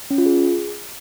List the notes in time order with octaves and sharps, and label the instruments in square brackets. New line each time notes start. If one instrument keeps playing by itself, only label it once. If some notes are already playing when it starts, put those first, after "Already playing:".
[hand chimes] C#4
F4
G#4